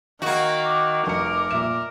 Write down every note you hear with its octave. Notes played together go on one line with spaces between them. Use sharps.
D#3 A#3 F#4
D6
F1 A#4 C#7
A#2 E5 E7